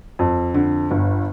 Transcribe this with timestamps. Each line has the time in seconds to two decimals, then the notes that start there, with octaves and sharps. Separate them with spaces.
0.19 F2
0.54 D3
0.91 G1